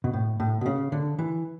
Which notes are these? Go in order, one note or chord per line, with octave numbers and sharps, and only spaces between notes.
B2
A2
A2
B2
C#3
D3
E3